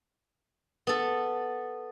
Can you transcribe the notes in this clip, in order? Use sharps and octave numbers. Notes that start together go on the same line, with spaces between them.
B3 A4